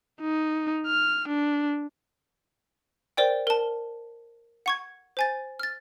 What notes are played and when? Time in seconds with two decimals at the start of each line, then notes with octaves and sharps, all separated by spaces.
0.21 D#4
0.87 F6
1.28 D4
3.17 A#4 C5 D5 G5
3.47 A#4 A5
4.66 F#5 C#6 G#6
5.17 C5 G#5 A6
5.60 F6 A6